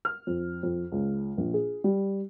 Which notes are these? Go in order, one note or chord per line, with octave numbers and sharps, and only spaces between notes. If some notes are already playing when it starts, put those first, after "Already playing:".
F6
F2
F2
C#2
A#1
G#4
G3